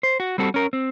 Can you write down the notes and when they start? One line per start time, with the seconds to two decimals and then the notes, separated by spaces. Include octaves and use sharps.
0.03 C5
0.20 F#4
0.38 G3 C4 F#4 A4
0.54 C#4 A#4
0.73 C4